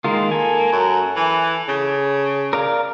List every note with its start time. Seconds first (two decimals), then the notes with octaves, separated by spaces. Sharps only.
0.04 D#3 G#3 A#3 F4
0.31 A4 G#5
0.72 F#2
1.16 E3
1.69 C#3
2.53 A#4 D5 F5